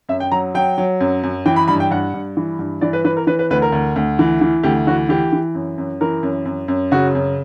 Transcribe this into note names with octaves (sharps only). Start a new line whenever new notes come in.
F#2 E5
G5
F#3 A#5
F#3 G5
F#3
F#2
F#2
E3 G5
B5
G2 B5
G5
G2 F#5
G2
E3
G2
E3 D5
B4
E3 B4
A#4
E3 B4
B4
D2 B4
A#4
D2
D2
E3
E3
D2 G4
E3 F#4
E3 G4
E3
F#2
F#2
E3 A#4
F#2
F#2
F#2
C#3 F#4
F#2